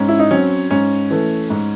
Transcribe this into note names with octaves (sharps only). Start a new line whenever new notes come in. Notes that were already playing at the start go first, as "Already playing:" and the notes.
Already playing: G#2 C#4
E4
D#4
F#3 C4 C#4
G#2 C#4
E3 A3
G#2